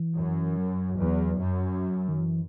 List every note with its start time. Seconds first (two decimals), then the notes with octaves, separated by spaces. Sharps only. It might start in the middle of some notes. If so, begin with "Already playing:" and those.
Already playing: E3
0.16 F#2
0.57 F#3
0.98 E2
1.38 F#2
2.08 D#3
2.20 E3